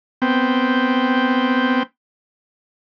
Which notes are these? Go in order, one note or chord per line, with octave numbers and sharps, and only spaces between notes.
B3 C4 G5